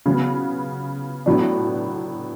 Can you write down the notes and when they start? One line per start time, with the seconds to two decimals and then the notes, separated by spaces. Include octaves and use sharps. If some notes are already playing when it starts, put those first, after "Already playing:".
0.06 C#3 F#3 B3
1.26 A2 F#3 B3 D4